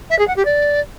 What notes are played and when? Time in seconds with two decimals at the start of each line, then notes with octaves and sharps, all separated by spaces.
0.10 E5
0.19 G#4
0.27 F#5
0.36 G4
0.45 D5